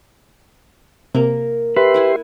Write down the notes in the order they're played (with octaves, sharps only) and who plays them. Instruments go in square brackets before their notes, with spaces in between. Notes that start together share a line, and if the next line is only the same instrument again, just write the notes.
[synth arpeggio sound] C3 [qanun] A#3 A#4
[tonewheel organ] G4 E5 C6 [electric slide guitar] B4
[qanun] E4 F#5 G#5